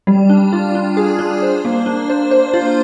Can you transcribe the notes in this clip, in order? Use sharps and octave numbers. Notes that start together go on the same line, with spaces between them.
G3
D4
F4
D4
G#4
D4
C5
A#3
D4
C5
C5
F4